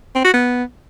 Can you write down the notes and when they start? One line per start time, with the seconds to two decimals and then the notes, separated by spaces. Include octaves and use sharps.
0.15 C4
0.24 F#4
0.34 B3